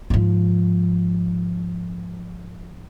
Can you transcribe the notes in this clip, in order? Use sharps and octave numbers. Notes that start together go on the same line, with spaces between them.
G#2 F3